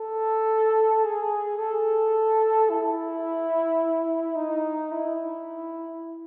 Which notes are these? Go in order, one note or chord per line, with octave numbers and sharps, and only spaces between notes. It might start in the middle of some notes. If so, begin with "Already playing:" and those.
Already playing: A4
G#4
A4
E4
D#4
E4